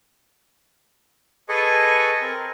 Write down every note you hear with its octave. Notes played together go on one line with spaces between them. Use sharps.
G#4 A4 B4 D#5 G#5 C#6
C4 A#4